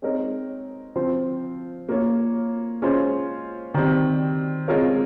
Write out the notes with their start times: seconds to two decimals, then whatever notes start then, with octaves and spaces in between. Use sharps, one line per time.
0.02 G#3 C4 D#4 A#4 C#5
0.96 F3 C4 F4 C5
1.89 A#3 F4 A#4 C#5
2.82 G#3 C#4 F4 C5
3.74 D#3 G3 C4
4.68 G#3 C4 F4 A#4 C#5